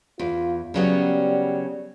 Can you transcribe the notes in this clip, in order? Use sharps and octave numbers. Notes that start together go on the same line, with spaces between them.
E2 F4
C#3 F#3 G3 B3